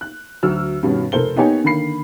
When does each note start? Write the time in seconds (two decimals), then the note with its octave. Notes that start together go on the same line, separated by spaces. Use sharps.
0.01 F#6
0.43 D2 F#3 E6 F6
0.83 G2 B2 D#3 C#4
1.12 F1 A4 A#4 C5 G7
1.36 A#3 B3 D#4 G4 C#5 G#5
1.64 D3 D#3 A#3 B5 C7